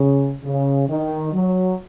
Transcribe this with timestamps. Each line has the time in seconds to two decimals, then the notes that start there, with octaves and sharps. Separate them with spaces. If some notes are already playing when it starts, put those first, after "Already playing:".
Already playing: C#3
0.43 C#3
0.88 D#3
1.33 F#3